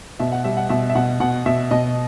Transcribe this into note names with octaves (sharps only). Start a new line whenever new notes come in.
B2 E5
F#5
G3 E5
F#5
B2 E5
E5
B2 F#5
B2 F#5
B2 E5
B2 D#5